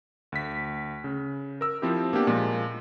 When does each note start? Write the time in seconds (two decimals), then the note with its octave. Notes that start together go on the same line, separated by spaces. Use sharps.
0.32 D2 B6
1.04 C#3
1.61 A#4 E6
1.82 F3 C4 E4 G4
2.13 A#3 B3 D4 G4
2.27 A#2 F3 G#3